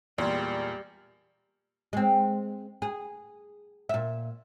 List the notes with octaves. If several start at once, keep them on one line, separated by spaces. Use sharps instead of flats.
E2 A#2 G3 G#3 D5 C6 G#6
G#3 C4
G#4
A#2 E5